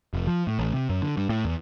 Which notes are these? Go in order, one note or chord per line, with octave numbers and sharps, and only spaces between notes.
F1
F3
A2
A1
C3
F#2
D3
G2
A2
E2